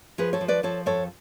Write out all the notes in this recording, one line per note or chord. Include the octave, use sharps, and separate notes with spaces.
F3 G#4 B4
A4 C#5
F3
B4 D5
F3 A4 C#5
F2 A4 C#5